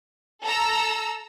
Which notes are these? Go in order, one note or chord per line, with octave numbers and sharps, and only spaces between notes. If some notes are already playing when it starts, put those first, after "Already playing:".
A4 A#5 E6